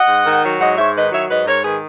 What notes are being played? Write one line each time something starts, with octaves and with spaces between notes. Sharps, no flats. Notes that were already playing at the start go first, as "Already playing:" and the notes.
Already playing: D#5 F#5
G#2
D#3
F#3
G#2 D#5 F#5
G#2 C#5 E5
D#3 B4 D#5
F#3 C#5 E5
G#2 B4 D#5
G#2 A#4 C#5
D#3 G#4 B4